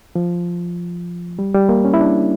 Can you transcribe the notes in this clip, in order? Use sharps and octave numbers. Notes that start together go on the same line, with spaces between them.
F3
G3
G3
A#3
C#4
E4
D4